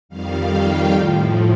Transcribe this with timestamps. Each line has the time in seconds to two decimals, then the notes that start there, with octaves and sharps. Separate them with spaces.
0.09 F2 D#3 G3 F5
0.51 G5
0.92 A2 F3